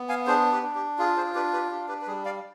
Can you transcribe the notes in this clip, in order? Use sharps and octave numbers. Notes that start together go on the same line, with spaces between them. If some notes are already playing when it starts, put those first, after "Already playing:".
Already playing: B3
F5 G#5
D4 G#4 C5
G4 B4
D4
G4
F4 G#4
G#4 C5
D4 G4 B4
G4 B4
D4 G4
G4 B4
B4
G3 G#4
D5 F5